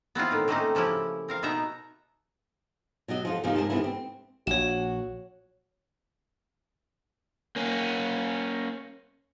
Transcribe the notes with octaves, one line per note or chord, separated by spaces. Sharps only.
B3 C4 E4 F4
A2 D#3 F5
D#3 A3 A#3 C4 C#4 D#4
C#3 F3 C#4 E4 G4
C4 A#4 F5
B2 B3 D#4 E5 A#5
B2 F#3 F#4 D#5
F3 F4 A4
E2 G#2 C3 F3 A#3 D#4
G#2 C#3 A#4 A5
C3 D#3 E3 A3 B3 E4
C4
A#1 F#4 C#5 E7
A#3 C#4